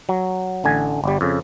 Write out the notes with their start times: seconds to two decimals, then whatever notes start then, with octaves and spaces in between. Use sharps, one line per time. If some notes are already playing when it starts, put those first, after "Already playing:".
0.09 F#3
0.64 A1 D3 G#5
1.04 G1 G3
1.21 F2 C#3